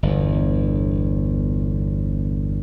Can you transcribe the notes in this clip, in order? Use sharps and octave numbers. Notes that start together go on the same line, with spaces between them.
G1 E2